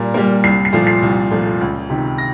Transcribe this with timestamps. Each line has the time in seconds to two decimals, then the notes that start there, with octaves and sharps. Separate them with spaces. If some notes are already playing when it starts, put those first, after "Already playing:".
Already playing: A#2 G3 A#3
0.14 G3 A#3
0.44 C2 C7
0.65 C7
0.73 A#2 F3 A3
0.87 C7
1.03 C2
1.31 A#2 F3 A3
1.61 C#2
1.90 C3 D#3
2.18 A#6